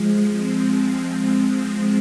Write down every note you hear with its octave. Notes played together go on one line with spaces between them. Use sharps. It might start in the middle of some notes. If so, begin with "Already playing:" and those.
Already playing: F3 G#3
G#3 C4